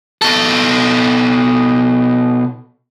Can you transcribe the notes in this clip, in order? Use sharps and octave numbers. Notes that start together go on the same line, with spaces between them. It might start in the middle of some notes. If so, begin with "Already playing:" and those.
B2 A4